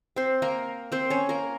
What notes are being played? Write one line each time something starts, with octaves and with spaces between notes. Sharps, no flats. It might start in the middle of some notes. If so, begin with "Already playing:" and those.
C4 C5
A#3 A#4
C4 C5
C#4 C#5
A#3 A#4